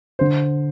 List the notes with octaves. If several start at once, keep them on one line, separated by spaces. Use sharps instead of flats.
D3 C5